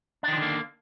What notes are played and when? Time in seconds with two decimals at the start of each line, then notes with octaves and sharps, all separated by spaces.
0.23 D4
0.28 D#3
0.33 F3
0.37 D3
0.42 A#3